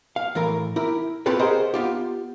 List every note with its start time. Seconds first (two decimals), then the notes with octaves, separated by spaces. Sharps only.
0.16 F5
0.35 A2 E3 A#4
0.76 E4 G4 A#4
1.26 C4 F4 G4 A4 B4 C#5
1.39 G4 G#4 A#4 C5 D#5 F#5
1.74 B3 F4 G4